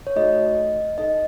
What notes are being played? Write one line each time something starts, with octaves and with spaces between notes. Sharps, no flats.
C#5
A3 D#4 F#4 A4 D#5
D#4 A4 D#5